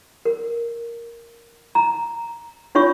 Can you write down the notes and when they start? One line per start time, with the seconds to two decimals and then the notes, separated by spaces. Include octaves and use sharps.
0.25 A#4
1.75 A#5
2.75 D4 F4 C#5 E5 C#6